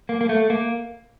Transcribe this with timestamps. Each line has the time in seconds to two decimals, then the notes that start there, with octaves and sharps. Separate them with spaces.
0.09 A#3
0.21 A#3
0.29 A3
0.50 A#3